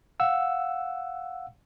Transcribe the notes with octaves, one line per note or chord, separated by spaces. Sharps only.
F5 F#5 E6